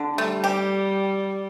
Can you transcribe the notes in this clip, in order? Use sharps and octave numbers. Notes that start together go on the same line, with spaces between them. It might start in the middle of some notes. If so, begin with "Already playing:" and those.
Already playing: D3
G3 A3
G4